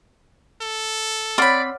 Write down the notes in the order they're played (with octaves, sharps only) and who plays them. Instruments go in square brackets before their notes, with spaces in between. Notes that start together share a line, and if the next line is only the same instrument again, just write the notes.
[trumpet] A4
[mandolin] C4 B5 [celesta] C#5 F#5 F6 [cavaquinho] D5